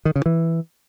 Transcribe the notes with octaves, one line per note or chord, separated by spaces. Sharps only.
D#3
C#3
E3